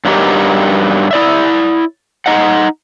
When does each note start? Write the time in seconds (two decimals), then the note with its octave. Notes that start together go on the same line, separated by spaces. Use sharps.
0.05 G2 F#3 B3 D#4 G4 A#4
1.11 E4 D5 E5
2.26 D#4 D#5 F#5